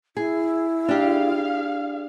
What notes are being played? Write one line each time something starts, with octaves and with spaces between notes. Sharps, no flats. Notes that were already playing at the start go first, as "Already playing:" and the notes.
E4 G#4
D4 G4 G#4 F5